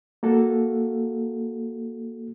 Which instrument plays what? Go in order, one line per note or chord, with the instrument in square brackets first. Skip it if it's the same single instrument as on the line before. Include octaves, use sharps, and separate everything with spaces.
[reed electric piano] A#3 F#4 A4